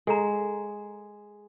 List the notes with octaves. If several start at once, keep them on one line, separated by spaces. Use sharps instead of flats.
G#3 A4 A#5